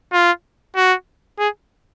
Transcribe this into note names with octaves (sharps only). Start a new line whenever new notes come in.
F4
F#4
G#4